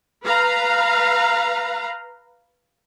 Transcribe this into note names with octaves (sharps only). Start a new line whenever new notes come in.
B4 F5 A#5